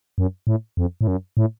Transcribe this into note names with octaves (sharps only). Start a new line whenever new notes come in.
F#2
A2
F2
A2
F#2
A2